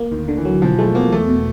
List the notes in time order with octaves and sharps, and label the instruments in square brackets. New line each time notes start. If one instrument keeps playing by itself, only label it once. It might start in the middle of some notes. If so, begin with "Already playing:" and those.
Already playing: [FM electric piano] A#3
[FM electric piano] D2 [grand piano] D#3
[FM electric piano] D3
[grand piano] E3
[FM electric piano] F#3
[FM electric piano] B2 [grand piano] F3
[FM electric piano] G#3 [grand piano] A3
[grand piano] A#3 [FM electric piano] B3
[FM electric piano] E2 [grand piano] A3
[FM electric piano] B2